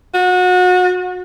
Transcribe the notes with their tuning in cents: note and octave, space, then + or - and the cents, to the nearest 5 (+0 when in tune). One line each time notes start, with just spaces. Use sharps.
F#4 -30